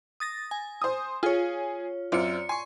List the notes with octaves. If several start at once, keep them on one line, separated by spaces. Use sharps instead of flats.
D#6 A6 A#6
G#5
C5 D#6
F4 G#4 C#5
F#2 C4 F4 D5 C#7
G#5 C6 C#6